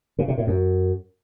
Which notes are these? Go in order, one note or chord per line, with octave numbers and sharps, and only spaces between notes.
C#3
C3
A2
F#2